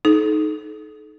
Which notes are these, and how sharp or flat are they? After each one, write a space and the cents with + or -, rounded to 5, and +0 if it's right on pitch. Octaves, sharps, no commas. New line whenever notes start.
D#4 +0 A4 -35